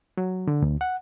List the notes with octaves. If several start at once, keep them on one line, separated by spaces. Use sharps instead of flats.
F#3
D3
D2
F#5